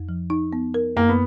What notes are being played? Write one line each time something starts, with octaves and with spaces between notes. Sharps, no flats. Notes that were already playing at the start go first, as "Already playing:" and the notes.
Already playing: F2
F3
D#4
B3
A#4
F#2 A#3
B3